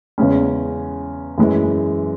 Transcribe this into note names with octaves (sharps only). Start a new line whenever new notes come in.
E2 C#3 G#3 C#4
F#2 E3 G#3